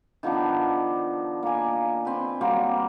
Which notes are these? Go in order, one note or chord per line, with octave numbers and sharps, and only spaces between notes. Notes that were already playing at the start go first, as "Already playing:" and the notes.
D#3 F3 B3 D4
A#3 G#5
C4 B4
F#3 G3 A#3 C4